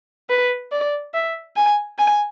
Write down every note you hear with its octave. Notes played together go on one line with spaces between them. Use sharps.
B4
D5
E5
G#5
G#5